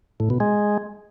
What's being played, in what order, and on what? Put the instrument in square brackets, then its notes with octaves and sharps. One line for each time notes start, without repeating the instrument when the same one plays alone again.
[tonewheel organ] A2
B2
G#3